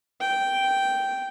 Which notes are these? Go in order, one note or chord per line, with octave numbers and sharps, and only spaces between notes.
G5